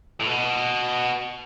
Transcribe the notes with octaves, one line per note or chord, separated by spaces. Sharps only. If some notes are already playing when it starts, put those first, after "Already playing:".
A2
B2